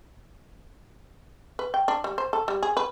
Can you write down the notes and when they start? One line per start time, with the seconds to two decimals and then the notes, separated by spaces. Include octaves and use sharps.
1.59 B4
1.74 G5
1.88 D4
2.04 G3
2.18 C5
2.33 A4
2.48 G3
2.63 G#4
2.77 B4